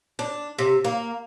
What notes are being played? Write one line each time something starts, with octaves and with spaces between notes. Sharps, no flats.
D4
C3
A#3